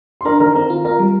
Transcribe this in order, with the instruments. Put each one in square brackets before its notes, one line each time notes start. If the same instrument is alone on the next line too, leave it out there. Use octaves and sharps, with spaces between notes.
[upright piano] C6
[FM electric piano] D4 [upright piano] A#4 A#5
[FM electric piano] D#3 [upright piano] A#4 A#5
[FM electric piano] C4 [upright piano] A#4 A#5
[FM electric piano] F4
[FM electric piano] F4 [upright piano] A#4 A#5
[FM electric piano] G3